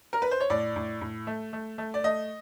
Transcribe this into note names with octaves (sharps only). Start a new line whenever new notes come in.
A#4
B4
C5
C#5
A2 D5
A2
A2
A3
A3
A3
D5
A3 D#5